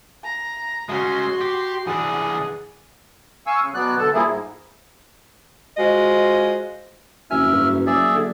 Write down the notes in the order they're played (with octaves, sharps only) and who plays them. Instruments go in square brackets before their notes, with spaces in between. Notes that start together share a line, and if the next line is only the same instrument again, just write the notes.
[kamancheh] A#5
[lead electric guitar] G#3 C#4 [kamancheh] F#4 C6
[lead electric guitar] G4
[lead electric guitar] E3 D4 [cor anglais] G#4 [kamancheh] F#5
[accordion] F5 G#5 C#6 E6
C#3
B2 F#3 B3 D5 F#6
D2 D3 A4 A5
F3 G3 A#3 E4 G#4
G#2
[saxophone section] G#3 F4 F#4 C5 D#5
[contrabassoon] F#1 [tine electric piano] F2 G#5 [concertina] E5 F6
[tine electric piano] G2 F#4 B4
[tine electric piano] F#3 A#3 [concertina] G#4 D5 E5
[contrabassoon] D3